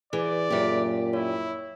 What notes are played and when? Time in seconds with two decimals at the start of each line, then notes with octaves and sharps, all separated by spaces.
0.13 E3 G#4 D5
0.50 F#2 A#2 G4
1.13 E4 C#5